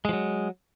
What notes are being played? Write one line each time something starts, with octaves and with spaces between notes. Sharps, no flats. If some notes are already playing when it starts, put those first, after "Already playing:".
F3 F#3 G#3